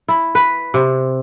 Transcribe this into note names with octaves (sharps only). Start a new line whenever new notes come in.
E4
B4
C3